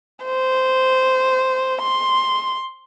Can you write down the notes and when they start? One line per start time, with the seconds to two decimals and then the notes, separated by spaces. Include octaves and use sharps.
0.24 C5
1.82 C6